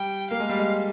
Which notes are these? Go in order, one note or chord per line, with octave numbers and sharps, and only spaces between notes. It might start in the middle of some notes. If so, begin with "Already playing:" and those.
Already playing: G3 G5
A#3 F5
G#3
G3
G#3